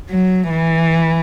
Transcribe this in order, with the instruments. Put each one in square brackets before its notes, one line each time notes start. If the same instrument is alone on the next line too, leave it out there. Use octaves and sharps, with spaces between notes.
[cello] F#3
E3